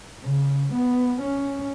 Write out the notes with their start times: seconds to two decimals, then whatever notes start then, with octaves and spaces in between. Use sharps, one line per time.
0.24 C#3
0.73 B3
1.21 C#4